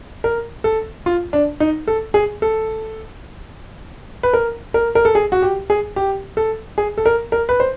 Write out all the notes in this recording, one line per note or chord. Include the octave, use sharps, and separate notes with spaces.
A#4
A4
F4
D4
D#4
A4
G#4
A4
B4
A#4
A#4
A#4
A4
G#4
F#4
G4
G#4
G4
A4
G#4
A4
A#4
A#4
B4
C5